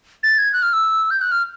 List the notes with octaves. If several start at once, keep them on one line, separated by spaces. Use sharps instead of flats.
A6
G#6
F#6
F6
E6
G6
F#6
F6